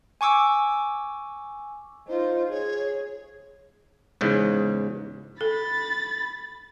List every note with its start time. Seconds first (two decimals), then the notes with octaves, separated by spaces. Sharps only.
0.21 G#5 C#6 D6 E6
2.08 D#4 F4 C5
2.51 G#4 C#5
4.21 E2 G#2 C#3
5.41 A4 B5 A6